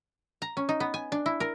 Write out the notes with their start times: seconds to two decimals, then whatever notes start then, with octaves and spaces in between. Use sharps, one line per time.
0.42 A#5
0.57 C#4
0.69 D#4
0.80 B3
0.94 G#5
1.12 D4
1.26 E4
1.40 A#4